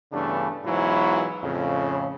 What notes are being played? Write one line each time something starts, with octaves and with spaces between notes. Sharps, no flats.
G2 C#3 E3 A3 B3 D4
G#2 B2 E3 F#3 E4 F4
F2 A2 C#3